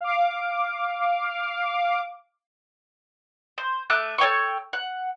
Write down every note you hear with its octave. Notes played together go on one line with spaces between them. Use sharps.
F5 D6
C5
A3 E5 D6 F#6
A4 C#5 G5 C#6
F#5